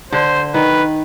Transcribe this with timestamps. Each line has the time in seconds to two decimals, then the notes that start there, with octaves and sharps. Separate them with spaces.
0.12 D3 C5
0.54 D#3 B4